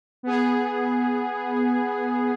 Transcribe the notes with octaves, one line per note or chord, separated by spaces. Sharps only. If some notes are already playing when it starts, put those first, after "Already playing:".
B3 G#4